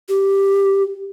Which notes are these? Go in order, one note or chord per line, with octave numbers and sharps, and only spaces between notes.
G4